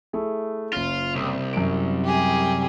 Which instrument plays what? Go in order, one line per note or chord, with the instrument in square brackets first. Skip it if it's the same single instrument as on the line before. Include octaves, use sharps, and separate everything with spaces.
[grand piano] A3 E4 G#4
[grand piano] F#1 C#4 [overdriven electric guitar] F4
[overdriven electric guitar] C2
[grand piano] F#2 D7
[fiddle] G4 G#4